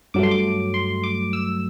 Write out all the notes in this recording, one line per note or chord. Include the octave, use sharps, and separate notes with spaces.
G2 F#3 A3 D6
C6
D6
C6
D6
E6